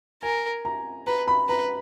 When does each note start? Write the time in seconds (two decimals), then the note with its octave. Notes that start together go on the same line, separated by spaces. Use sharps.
0.23 A#4 G#5
0.65 A#5
1.07 B4 A#5
1.28 B5
1.49 B4 A#5